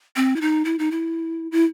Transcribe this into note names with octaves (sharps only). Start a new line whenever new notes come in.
C4
E4
D#4
E4
D#4
E4
E4